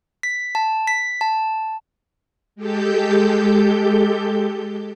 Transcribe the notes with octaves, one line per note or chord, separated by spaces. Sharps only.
B6
A5
B6
A5
G#3 G4 A4 G6